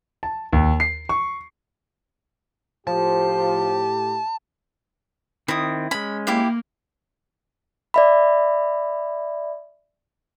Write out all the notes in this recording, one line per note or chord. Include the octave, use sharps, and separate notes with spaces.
A5
D#2
C7
C#6
A2 F3 G4 A5
D#3 C4 E4 D#6
G#3 C#4 B5
A#3 E4 G4 F5
D5 E5 B5